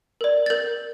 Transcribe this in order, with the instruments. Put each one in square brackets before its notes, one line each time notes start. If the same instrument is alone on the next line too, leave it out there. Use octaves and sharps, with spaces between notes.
[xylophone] A#4 D5
A6
A#4 G6